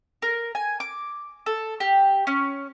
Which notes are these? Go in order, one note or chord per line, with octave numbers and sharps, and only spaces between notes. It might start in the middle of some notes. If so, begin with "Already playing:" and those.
A#4
G#5
D6
A4
G4
C#4